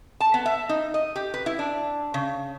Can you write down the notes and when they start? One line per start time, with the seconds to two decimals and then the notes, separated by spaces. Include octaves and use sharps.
0.20 A5
0.34 B3
0.46 E5
0.69 D#4
0.94 D#5
1.16 G4
1.34 B4
1.46 E4
1.59 D4
2.14 C#3